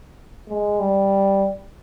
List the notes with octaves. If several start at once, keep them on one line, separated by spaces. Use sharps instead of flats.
G#3
G3